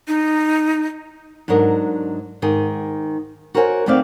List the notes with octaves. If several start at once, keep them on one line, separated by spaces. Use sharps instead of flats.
D#4
G#2 F#3 D4 A#4 D#5
G#2 D#3 G#4
F#4 A#4 C5 C#5 F#5 G#5
D#2 D3 A3 C4 D5 F5